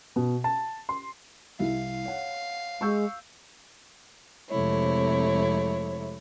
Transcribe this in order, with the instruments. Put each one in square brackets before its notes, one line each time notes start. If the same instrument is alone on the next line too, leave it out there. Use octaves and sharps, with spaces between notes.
[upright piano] B2
A5
C6
[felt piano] C2 E4 [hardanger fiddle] F5
[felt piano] C#5 F#5
[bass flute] G#3 [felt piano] C#6 E6 G6
[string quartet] F2 C3 G#3 A3 E4 C#5